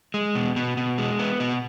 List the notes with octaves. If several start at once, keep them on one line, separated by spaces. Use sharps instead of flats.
G#3
B2
B2
B2
G#3
B3
B2